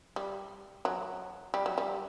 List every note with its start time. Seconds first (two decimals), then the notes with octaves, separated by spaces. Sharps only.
0.16 G3
0.85 F#3
1.54 G3
1.66 F#3
1.78 G3